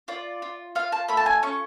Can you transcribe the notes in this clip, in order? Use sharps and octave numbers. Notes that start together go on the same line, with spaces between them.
F4 D5
F4
F4 F5
A5
A3 B5
A5
G#5
C#4 C#6